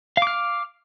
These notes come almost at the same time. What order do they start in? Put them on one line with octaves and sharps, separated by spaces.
F5 D6 F6